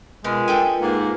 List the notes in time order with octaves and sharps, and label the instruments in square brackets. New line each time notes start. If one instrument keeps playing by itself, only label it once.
[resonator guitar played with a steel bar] B2 [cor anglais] G#3 [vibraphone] F4 A#4 B4
[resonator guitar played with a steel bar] A4 G5 G#5
[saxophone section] G#2 [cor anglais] A#3